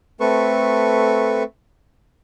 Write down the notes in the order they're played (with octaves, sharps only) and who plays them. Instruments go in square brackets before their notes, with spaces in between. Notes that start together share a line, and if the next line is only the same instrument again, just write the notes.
[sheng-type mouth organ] A3 C4 A4 B4 C#6